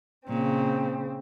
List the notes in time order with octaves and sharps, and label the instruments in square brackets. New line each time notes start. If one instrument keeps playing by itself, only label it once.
[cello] A#2 [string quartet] C#3 C4